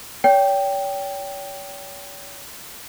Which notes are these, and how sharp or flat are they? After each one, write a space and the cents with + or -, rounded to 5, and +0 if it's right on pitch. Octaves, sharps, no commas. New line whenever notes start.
C#5 +35 G5 +0